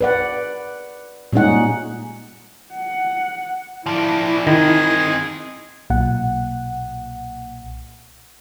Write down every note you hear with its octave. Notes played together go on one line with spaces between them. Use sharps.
B4 D5 F#5
A#2 G3 G#3 C#4 D#4 F#5
F#5
F3 D4 E4
D#3 C4 G#4 D#5
B1 A#2 F#5